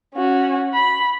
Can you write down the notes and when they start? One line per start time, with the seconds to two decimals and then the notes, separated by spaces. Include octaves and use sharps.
0.15 C#4 F#4
0.74 B5